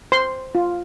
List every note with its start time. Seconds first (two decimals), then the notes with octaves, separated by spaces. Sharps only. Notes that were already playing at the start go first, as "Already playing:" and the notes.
0.12 C5 C6
0.55 F4